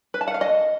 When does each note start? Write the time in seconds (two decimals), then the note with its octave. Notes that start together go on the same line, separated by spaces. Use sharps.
0.14 B4
0.21 A5
0.28 F#5
0.34 F5
0.41 D#5